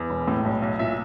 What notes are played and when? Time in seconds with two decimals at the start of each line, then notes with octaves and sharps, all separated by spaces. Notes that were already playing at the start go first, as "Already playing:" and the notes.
Already playing: E2
0.10 E1
0.28 A2
0.45 B1
0.62 B1
0.79 A#2 E5